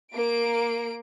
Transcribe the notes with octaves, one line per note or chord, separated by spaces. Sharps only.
A#3 D7